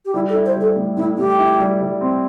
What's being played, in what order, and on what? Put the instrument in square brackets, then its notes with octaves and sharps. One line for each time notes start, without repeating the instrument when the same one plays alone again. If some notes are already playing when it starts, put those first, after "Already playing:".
[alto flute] G4
[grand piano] G3 [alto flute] E4
[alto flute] A4
[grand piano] E4
[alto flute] C5
[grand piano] G3 [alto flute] A4
[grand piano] A2
[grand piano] A2 [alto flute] E4
[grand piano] A2 [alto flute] G4
[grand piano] E4
G3
G3
C4